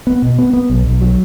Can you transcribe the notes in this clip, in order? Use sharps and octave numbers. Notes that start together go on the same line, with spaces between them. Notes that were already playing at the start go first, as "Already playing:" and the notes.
B3
B2
B3
B3
B1
B1
F#3